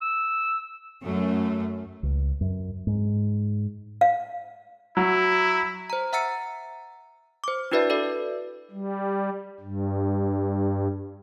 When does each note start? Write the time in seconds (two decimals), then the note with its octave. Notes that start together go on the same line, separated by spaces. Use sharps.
0.02 E6
1.04 F#2 A3
2.03 C#2
2.41 F#2
2.87 G#2
4.01 F5
4.97 F#3 E4
5.90 C5 A#5
6.13 E5 F#5 A#5 E6 A6 C#7
7.44 C5 D6
7.71 D4 E4 F#4 B4 D5 E5
7.89 F#4 A4 B4 D5 E5
8.71 G3
9.60 G2